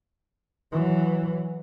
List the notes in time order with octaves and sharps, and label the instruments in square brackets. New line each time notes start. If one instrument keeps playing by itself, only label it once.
[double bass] E3 F#3